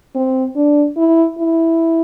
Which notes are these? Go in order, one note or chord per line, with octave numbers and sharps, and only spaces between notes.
C4
D4
E4
E4